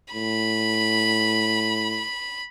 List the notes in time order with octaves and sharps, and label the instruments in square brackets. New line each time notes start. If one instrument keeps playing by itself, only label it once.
[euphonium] A2 [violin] B5